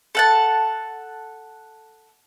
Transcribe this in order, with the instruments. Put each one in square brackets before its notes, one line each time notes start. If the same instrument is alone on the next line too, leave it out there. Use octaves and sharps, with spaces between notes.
[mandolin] A4 F#5 A5